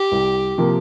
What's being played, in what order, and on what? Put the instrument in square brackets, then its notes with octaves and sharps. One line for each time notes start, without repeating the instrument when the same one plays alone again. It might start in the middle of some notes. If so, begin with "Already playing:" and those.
Already playing: [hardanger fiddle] G4
[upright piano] C2
C3 F3 A#3